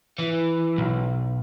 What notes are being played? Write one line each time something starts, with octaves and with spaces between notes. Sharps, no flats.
E3
B1